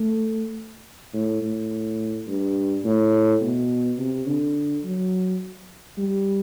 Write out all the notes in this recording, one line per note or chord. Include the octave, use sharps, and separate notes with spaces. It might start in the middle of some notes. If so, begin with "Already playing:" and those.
Already playing: A3
A2
A2
G2
A2
B2
C3
D3
F#3
G3